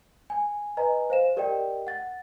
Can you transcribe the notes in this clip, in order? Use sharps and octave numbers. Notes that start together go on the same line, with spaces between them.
G#5
B4 D#5 G#5 A#5
C5 F5 E7
G4 A#4 D5 D#5 G5
F#5 A6